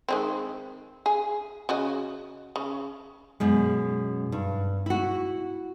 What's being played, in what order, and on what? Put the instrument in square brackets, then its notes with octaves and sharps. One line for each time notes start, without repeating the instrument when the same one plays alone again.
[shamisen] D#3 G#3 C4
G#4
C#3 F#4 D#5
C#3
[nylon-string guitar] F#2 B2 G#3
G2
E4 F#4